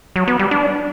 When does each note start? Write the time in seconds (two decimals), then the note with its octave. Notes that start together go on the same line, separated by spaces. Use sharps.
0.16 F#3
0.27 B3
0.39 G3
0.51 D4